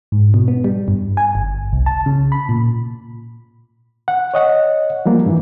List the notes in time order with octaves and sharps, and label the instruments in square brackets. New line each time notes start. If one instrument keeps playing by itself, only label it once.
[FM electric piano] G#2
B2
B3
G3
G2
G#5
G1
C2
A5
C#3
B5
A#2
[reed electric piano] F#5
C#5 D#5 F#5
F3 G3 A#3 F4
G2 E3